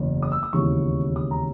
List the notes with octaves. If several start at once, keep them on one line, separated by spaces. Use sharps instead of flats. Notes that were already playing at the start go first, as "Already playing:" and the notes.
Already playing: F#1 E2 C#3
D#6
E6
D#6
E1 D#2 C#3 E3 C#6
D#6
A#5